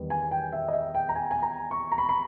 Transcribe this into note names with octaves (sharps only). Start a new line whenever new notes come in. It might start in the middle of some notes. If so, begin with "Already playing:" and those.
Already playing: E2 D#3 G3 B3
G#5
G5
E5
D#5
E5
G5
A#5
G#5
G#5
A#5
C#6
A#5
B5
B5